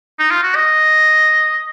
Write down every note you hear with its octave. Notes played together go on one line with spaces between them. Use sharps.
D#4
F4
F#4
D#5